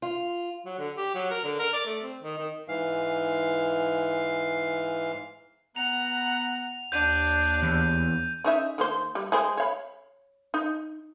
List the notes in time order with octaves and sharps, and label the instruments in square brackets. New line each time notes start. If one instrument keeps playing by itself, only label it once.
[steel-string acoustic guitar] F4
[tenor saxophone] F#3
D3
G4
F#3
A#4
D3
A#4
D5
A3
C4
D#3
D#3
[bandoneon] G#2 E3 F5
[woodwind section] B3 A#5 [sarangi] F#5 [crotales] F7
[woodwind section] D#2 [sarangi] D4 [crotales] G6 D#7
[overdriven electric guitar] E2
[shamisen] C#4 D#4 E5
D#3 A#3 C5
G3
G#3 G#4 C5
C#5 F5 B5
D#4